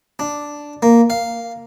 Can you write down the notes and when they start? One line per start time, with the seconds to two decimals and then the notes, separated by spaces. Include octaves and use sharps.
0.19 D4
0.83 A#3
1.10 F5